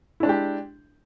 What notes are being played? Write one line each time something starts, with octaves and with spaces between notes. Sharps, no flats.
G#3 D4 E4 G4